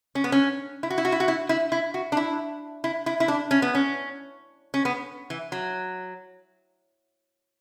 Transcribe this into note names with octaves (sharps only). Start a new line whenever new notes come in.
C#4
B3
C#4
E4
F#4
E4
F#4
E4
F#4
E4
E4
E4
F#4
D4
E4
E4
E4
E4
D4
C#4
B3
C#4
C#4
B3
E3
F#3